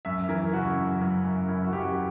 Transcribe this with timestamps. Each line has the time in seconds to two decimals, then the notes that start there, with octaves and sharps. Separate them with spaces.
0.05 F#2 E5
0.29 E3 A#4
0.53 C#3 F#4
0.76 F#2
1.01 F#2
1.25 F#2
1.48 F#2 E4
1.65 F#4
1.72 F#2 G4
1.80 F#4